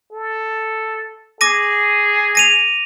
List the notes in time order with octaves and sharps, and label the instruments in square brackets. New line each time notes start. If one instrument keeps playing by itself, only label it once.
[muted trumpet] A4
[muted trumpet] G#4 [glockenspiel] D6 A#6 D#7
[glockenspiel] A#6 D#7 F7